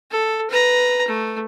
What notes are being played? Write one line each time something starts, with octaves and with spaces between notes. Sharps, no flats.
A4
B4 A#5
A3